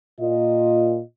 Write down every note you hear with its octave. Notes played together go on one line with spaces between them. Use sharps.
A#2 F4 D#5